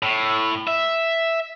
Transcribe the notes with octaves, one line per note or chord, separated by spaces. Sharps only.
A2
E5